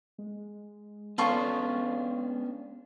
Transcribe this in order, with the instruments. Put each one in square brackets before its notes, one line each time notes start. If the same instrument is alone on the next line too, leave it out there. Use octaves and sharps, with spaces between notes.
[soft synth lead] G#3
[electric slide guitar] B3 C#4 D4 [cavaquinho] F4 A4 C#6